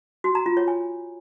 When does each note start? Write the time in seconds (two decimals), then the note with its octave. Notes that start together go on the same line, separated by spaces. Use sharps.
0.24 F#4
0.35 A#5
0.46 F4
0.57 C#5
0.68 G#5